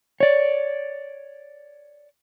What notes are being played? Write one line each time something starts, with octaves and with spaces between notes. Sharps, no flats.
C#5 D5